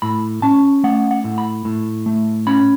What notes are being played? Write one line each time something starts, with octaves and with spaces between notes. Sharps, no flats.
A2 B5
C#4 A5
A3 F#5
F#5
A2
B5
A2
A3
C#4 B5